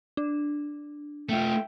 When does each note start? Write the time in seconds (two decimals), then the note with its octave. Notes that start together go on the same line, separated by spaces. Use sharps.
0.17 D4
1.29 A3 F4 E5 G5